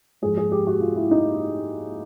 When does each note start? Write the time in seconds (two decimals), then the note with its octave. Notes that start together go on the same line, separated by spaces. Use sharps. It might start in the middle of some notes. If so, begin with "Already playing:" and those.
0.22 G#2 F3 G#4
0.37 G#4
0.52 G4
0.67 F#4
0.81 F4
0.96 E4
1.11 D#4